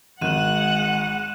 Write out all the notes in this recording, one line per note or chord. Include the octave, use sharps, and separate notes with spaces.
G#1 G#3 F#5 F#6 D#7 E7 F#7